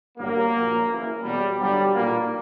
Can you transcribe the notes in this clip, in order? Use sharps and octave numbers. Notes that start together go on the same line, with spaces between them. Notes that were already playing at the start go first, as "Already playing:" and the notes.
G1 G2 F#3 A#3
A#1 A#2 F#3
F#1 F#2 E3
E2 B2 F#3 G3
G1 G2 F#3 G3
B1 A#2 F#3 A#3